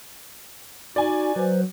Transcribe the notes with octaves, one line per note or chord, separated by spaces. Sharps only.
D#4 F#4 D5 G#5
F#3 B4 C5